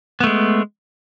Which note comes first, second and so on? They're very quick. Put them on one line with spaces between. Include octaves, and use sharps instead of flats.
B3 A3 G#3